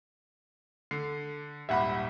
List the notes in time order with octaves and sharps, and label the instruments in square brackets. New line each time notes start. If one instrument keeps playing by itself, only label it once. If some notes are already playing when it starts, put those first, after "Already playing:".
[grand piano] D3 [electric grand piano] C7
[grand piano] D#1 G#1 G3 [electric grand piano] E5 F#5 B5